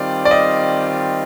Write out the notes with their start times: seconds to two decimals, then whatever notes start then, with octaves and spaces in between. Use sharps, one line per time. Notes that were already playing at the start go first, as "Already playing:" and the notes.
Already playing: D#3 G3 C4 F4 D5
0.25 D5
0.31 D#5